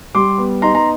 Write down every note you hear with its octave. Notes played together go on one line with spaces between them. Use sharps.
G3 C6 D6
B3
D#4 A#5 C6
A#5 C6